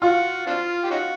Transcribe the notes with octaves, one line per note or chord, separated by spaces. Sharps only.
F4 F#4
C4 D4 F4
G4
C#4 D#4 F#4